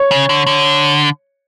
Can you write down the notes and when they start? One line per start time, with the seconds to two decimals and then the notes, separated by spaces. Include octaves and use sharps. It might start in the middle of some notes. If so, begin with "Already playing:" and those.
Already playing: C#5
0.11 C#3
0.29 D3
0.47 D3